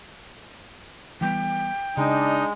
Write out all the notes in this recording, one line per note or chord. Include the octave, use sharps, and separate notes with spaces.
E3 G3 B3 G5
C#3 G#3 D4 D#4